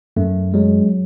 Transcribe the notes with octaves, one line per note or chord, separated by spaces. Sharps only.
F#2 A3
F#3 G#3